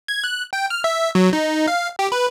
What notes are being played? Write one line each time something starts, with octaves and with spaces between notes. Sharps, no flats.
G#6
F#6
G5
F6
E5
F#3
D#4
F5
G4
B4